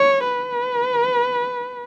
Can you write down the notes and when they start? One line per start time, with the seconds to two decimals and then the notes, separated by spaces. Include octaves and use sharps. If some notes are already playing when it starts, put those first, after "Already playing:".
Already playing: C#5
0.25 B4